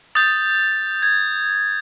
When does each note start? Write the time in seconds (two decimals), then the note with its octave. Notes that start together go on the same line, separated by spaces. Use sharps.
0.15 D#6 G6 A6
1.02 G#6